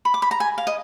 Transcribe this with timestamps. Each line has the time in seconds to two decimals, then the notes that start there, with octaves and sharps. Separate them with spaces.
0.05 B5
0.14 D6
0.22 B5
0.31 A#5
0.40 G#5
0.58 F5
0.67 D#5